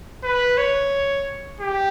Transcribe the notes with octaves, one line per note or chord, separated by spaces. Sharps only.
B4
C#5
G4